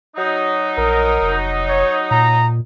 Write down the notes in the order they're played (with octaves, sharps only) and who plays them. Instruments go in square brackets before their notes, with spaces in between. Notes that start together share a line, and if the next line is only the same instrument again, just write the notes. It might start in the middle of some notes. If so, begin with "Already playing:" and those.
[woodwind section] F#3 D#4
[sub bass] A#1 [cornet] A#4
[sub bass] F1
[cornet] C#5
[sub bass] A#2 [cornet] A#5